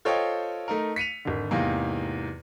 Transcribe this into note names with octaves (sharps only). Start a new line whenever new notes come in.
F4 A4 C5 C#5 D#5 G5
A3 D#4 A#4
B6 C#7 D#7 F7
G#1 D3
E2 G#2 C3 A#3